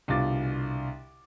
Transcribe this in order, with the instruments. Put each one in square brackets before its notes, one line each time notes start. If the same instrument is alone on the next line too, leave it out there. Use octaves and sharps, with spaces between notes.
[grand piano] C2 B2 D3 F4 D6 A6